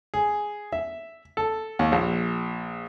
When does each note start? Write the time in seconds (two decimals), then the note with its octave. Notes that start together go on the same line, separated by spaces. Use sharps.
0.14 G#4
0.72 E5
1.37 A4
1.79 D#2
1.92 A#1